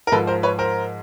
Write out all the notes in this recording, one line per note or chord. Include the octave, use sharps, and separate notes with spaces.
A#4
G#2 F3 A4 B4
A#4 C5
B4 C#5
A#4 C5